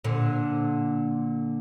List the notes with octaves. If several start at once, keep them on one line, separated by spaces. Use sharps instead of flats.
A#2 D3